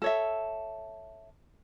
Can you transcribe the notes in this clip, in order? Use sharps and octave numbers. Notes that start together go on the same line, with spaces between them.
A4 C#5 E5